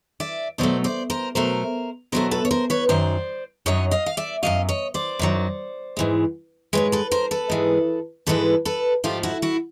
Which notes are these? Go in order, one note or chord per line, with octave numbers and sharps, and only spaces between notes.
D5 E5
B2 F#3 A3 C5 D5
C5 D5
A#4 C5
B2 F#3 A3 A#4 C5
B2 F#3 A3 A#4 C5
A4 B4
C#5
A#4 C5
B4 C#5
F#2 D#3 F#3 C5 D5
F#2 D#3 F#3 C#5 D#5
D#5 F5
F5
D5 E5
F#2 D#3 F#3 D#5 F5
C#5 D#5
C5 D5
F#2 D#3 F#3
G#2 E3 G#3
G#2 E3 G#3 B4 C#5
A4 B4
A#4 C5
A4 B4
G#2 E3 G#3
G#2 E3 G#3 A4 B4
A4 B4
G#2 F3 A3 F4 G4
E4 F#4
E4 F#4